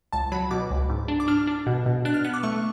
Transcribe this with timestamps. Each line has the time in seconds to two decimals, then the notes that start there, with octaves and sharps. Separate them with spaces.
0.13 C#2 A5
0.32 F#3 B5
0.51 B2 D6
0.71 C#2
0.90 G#2
1.08 D4
1.20 D6
1.28 D4 F6
1.47 D4
1.67 B2
1.86 B2
2.05 D4 F#6
2.14 F6
2.24 B3 F#6
2.34 D6
2.43 A3 C#6